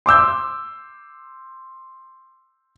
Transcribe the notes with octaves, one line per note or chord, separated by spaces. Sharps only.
C6 D6 E6 G6